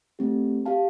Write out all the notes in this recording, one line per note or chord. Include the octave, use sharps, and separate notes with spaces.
A3 C4 G4
G4 F5 A5